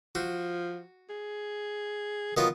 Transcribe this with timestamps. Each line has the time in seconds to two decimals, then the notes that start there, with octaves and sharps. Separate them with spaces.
0.15 F3 F#4
1.09 G#4
2.37 D#3 F#3 B3 F4